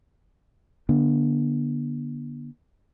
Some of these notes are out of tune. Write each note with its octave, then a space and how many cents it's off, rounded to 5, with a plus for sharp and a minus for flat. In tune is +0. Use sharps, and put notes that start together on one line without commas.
D3 -5 B3 -45 D4 +0